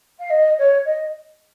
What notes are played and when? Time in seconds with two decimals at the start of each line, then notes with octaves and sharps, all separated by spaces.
0.18 F5
0.29 D#5
0.58 C#5
0.85 D#5